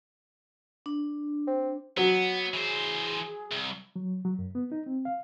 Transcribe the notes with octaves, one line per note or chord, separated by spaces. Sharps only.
D4
C4
F#3 B3 F#5
E3 G#4 C5
C2
F#3
F#3
F#2
B3
D#4
C4
F5